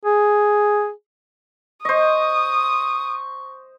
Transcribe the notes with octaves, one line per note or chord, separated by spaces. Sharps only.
G#4
C5 D#5 C#6 D#6